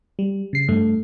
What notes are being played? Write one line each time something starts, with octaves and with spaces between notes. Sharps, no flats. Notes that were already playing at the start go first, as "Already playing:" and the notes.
G3
C#3 C7
G2 A3